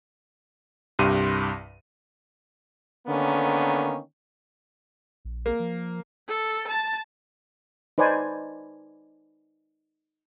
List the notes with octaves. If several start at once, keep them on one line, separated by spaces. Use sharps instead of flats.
C2 G2 G4 C6 D#7
D3 D#3 A#3 B3 C#4
A#1
A#3
F3
A4
A5
D#4 B4 C5 D5 G#5